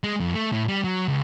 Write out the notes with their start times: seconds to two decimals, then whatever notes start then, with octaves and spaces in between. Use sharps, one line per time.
0.04 G#3
0.20 F2
0.34 A3
0.53 A2
0.68 G3
0.84 F#3
1.08 C#2